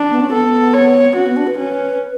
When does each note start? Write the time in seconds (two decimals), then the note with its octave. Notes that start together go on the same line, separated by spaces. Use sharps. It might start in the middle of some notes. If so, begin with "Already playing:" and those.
Already playing: D4
0.11 B3
0.21 C#4
0.32 B3 A4
0.73 C#5
1.15 C#4 F#4
1.26 B3
1.37 D4
1.47 B4
1.58 C#4